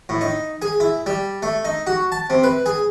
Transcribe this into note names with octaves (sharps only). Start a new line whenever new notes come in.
A2
D#4
G#4
E4
G3
A3
D#4
F#4
A5
C3
B4
G#4